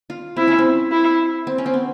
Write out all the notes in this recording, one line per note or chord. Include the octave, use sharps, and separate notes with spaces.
F4
C4 E4
C#4
C4
E4
C4
C#4
C4
B3